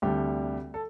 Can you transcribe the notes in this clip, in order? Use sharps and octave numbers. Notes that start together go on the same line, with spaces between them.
D2 C3 G3 D4 G4
A4